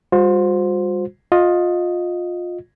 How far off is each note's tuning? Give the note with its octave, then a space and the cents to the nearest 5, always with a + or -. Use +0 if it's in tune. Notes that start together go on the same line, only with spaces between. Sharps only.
G3 +30 F#4 -45 C5 +0
F4 +20 D#5 +0